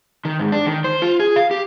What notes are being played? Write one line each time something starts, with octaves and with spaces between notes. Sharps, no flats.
D#3
G#2
D4
D#3
C5
F4
G#4
F5
G4